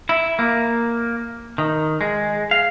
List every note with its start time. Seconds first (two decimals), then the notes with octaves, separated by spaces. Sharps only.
0.09 E4
0.39 A#3
1.58 D#3
2.01 G#3
2.51 F5